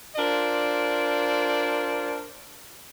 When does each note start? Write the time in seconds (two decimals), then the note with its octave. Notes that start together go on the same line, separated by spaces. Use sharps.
0.17 D4 F4 A#4 C5 D5